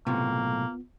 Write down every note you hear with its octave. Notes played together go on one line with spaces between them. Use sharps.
B1 A2 C3 A#3 B3 F4